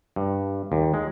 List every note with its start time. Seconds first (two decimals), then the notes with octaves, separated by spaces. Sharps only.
0.16 G2
0.72 D#2
0.94 G#3